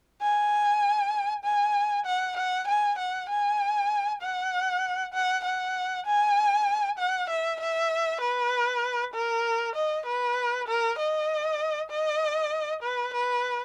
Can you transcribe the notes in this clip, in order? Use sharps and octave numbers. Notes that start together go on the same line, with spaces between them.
G#5
G#5
F#5
F#5
G#5
F#5
G#5
F#5
F#5
F#5
G#5
F#5
E5
E5
B4
A#4
D#5
B4
A#4
D#5
D#5
B4
B4